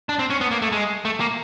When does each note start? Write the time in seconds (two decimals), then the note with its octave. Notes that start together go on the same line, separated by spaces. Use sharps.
0.09 D4
0.19 C4
0.30 C#4
0.41 B3
0.51 A#3
0.62 A3
0.72 G#3
1.05 A3
1.20 A#3